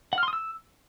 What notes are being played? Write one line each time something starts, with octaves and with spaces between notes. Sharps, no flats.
F#5
F6
C6
D#6
E6